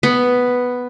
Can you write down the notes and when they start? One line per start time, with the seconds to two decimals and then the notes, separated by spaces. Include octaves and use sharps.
0.03 B3